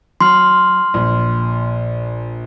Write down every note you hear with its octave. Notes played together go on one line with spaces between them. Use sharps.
F#3 C6 F6
A#1